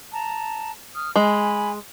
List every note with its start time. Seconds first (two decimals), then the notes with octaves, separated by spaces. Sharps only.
0.13 A5 A#5
0.94 D#6 F6
1.16 G#3 G#5 B5